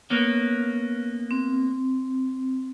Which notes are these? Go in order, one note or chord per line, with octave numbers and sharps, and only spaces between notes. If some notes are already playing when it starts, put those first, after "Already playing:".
A#3 B3 C#4
C4